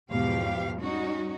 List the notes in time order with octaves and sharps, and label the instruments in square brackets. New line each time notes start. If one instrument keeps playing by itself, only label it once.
[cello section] E2 G#2 B2 F3 G4 F5
G3 C#4 D#4 F#4